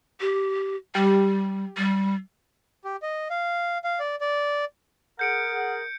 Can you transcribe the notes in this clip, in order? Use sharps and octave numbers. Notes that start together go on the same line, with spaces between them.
G4
G3 G4
G3
G4
D#5
F5
F5
D5
D5
G#4 A#4 F#5 G6 C#7 D7